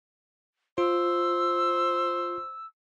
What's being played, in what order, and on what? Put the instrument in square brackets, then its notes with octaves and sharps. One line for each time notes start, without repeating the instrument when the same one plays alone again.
[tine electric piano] F4 [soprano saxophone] C5 [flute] E6